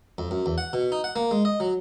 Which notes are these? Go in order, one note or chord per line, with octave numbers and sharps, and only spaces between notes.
F2
F#2
E2
F#5
B2
D#4
F#5
A#3
G#3
D#5
F#3